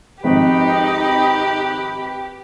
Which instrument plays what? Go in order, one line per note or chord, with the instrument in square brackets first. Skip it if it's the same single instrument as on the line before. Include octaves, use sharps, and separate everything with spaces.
[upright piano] G#1 F2 [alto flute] D#4 [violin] G4 [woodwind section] B4 G5 B5